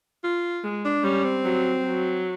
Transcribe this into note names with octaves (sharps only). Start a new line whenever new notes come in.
F4
G#3
D4
G3 C#4
C4
F#3
F#3